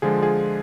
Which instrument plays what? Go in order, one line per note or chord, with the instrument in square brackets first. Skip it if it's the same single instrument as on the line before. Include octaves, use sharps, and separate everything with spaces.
[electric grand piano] D3 F3 G#3 F4 G#4
F4 G#4